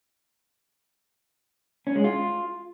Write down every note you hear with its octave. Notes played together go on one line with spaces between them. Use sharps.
C#4
G#3
F4